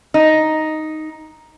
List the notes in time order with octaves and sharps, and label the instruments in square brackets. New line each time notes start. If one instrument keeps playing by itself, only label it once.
[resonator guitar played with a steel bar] D#4